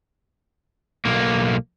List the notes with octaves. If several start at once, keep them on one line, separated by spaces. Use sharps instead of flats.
B1 A#3